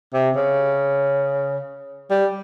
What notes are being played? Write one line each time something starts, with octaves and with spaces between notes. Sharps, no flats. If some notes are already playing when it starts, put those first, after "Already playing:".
C3
C#3
G3